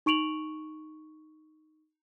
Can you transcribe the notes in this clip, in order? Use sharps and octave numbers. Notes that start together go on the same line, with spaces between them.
D#4 C#6 D7 F7 F#7